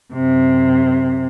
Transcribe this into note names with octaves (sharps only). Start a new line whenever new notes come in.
F#2 C3